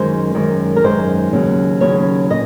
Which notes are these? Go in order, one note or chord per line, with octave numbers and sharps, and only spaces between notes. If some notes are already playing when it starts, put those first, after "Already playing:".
Already playing: F#2 D#3 G#3 C5
F#2 D#3 G#3
A#4
F#2 D#3 G#3 C5
D#2 C#3 F#3
D#2 C#3 F#3 C#5
A#2 D#5